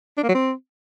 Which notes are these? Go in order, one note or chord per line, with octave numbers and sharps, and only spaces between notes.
D4
A#3
F#3
C4